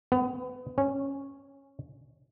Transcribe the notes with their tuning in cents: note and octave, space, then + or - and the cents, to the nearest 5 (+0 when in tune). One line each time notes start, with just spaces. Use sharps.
B3 +30
C#4 -10